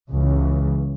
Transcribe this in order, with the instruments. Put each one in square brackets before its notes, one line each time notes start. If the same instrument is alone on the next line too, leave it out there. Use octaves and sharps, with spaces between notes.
[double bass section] C#2 C#3 E3